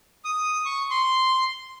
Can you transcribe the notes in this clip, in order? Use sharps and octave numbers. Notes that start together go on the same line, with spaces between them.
D#6
C#6
C6